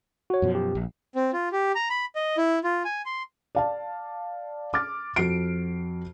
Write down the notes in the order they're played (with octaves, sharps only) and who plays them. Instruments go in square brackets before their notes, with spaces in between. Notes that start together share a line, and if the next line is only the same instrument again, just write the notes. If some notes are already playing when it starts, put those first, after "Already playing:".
[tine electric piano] F#4 C#5
[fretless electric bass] F#2 B2 F3
[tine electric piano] G4
[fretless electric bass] A#1
[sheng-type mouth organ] C4
F4
G4
A#5
B5
D#5
E4
F4
G#5
C6
[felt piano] D5 F5 A5
D6 F6 A6
F2 F#4 C7 D7